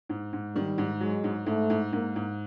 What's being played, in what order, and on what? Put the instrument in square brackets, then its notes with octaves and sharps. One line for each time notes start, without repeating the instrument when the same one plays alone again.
[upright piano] G#2
G#2
[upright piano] D#3 [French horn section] G3
[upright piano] G#2
[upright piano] F#3 [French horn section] G#3
[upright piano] G#2
[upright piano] G#2 [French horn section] A3
[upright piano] G#2
[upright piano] G#2 [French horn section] A#3
[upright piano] G#2